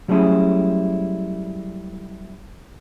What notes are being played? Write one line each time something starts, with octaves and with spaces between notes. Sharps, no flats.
F#3 G3 A3 C#4 E4 G#4